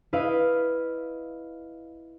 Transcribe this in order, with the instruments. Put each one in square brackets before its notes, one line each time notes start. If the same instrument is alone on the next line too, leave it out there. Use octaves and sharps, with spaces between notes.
[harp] E4 B4 D#5 F5